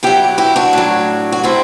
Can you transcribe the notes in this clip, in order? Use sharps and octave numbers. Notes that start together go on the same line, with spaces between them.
B2 F#3 E4 G4
E4 G4
D4 F#4
A2 F#3
F#4
A2 G3 C4 E4